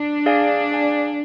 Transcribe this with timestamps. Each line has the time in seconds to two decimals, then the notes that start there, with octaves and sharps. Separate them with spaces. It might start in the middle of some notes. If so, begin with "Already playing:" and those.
Already playing: D4
0.26 G#4 D5 F5 G#5
0.71 G#4 D5 F5 G#5